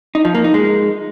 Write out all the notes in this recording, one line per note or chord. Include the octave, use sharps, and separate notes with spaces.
D#4
F3
A#3
D#4
G#3